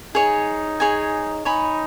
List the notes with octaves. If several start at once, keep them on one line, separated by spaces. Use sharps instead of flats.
D#4 G#4 C#5 G#5
G#4 C#5 G#5
D#4 C#5 G#5 B5